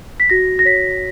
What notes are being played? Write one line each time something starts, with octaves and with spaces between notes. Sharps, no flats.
B6
F#4 A#6
A#6
C#5 B6